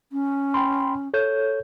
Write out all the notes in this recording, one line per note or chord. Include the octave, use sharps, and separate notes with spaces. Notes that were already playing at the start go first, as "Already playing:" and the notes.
C#4
G5 B5 C6
A4 C#5 G6